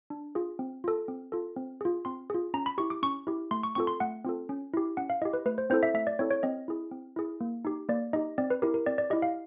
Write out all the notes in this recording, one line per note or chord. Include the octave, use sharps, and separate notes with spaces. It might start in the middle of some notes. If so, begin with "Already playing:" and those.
D4
F4 G#4
C4
F4 A4
C4
F4 A4
C4
F4 G#4
C4 C6
F4 G#4
C#4 A#5
B5
E4 G4 C#6
D6
C#4 C#6
E4 G4
A3 C6
C#6
C4 F4 A4 C#6
C6
A3 F#5
C4 F4 A4
C#4
E4 G4
C#4 F#5
F5
E4 G4 D#5
B4
A3 B4
C5
C4 E4 A4 C5
E5
A3 E5
D5
C4 E4 A4 C#5
C#5
C4 D#5
E4 G#4
C4
E4 G#4
A#3
D#4 G4
A#3 D5
D#4 G4 D#5
C4 D5
B4
E4 G4 A#4
A#4
C4 D5
D5
E4 G4 D#5
F5